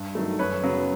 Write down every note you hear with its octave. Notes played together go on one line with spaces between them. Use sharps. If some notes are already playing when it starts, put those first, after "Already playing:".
Already playing: G2
D#3 F#3 A3
F#2 B4 C#5
C#3 F#3 B3